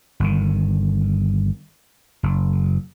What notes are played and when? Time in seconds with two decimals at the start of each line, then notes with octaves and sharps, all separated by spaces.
0.20 G1 D#3
2.23 F#1